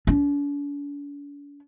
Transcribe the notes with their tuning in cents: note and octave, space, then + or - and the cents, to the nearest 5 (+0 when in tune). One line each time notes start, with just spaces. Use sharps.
D4 -45